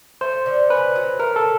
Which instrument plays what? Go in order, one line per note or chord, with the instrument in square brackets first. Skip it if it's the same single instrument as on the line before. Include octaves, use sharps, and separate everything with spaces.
[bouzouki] A3 [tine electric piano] C5
[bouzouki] D3
[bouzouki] C#4 [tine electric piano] B4
[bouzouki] F#3
[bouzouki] A3 [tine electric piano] A#4
[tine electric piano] A4